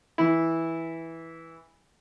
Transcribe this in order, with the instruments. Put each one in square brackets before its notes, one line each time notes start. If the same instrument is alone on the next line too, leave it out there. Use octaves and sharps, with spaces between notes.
[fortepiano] E3 E4